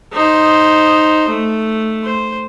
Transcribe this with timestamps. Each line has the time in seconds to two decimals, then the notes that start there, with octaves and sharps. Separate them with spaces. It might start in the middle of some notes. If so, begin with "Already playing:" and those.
0.13 D#4 C5
1.28 A3
2.05 C5